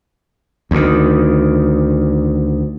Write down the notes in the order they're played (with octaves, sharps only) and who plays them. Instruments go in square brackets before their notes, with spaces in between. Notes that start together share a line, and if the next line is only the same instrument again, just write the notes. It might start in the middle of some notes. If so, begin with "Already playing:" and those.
[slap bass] D2 D#3